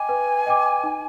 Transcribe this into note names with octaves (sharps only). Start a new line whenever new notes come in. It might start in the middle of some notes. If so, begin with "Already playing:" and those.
Already playing: D#5 G5 G#5 D6
B4
D#5 G5 D6
D#4